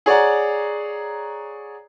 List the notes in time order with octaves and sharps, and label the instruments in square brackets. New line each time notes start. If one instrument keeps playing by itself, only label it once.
[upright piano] G#4 C#5 D5 F#5 A#5